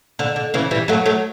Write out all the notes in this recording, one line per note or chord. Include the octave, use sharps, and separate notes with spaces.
D3
D3
C#3 E3
E3 G3
F#3 A3
F#3 A3